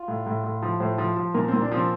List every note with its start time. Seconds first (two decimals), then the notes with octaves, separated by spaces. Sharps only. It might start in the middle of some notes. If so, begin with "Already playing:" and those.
Already playing: F4
0.08 A2
0.27 A2
0.44 A2
0.62 F3
0.80 A2 C5
0.98 F3
1.17 F3
1.34 A#2 A#4
1.48 C4
1.54 A#2
1.62 D4
1.72 F3 C4